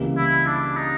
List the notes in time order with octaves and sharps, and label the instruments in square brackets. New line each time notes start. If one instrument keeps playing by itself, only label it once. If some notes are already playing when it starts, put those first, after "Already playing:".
Already playing: [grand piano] C#2 C3 E3 G3 A#3
[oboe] E4
D4
D#4